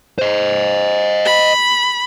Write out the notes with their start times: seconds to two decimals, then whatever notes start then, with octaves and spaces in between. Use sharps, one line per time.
0.18 C5 D#5
1.25 B5